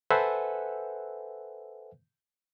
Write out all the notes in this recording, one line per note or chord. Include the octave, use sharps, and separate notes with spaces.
A4 B4 C5 E5 F#5 G#5